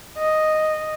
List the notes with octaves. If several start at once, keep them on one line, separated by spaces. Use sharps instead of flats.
D#5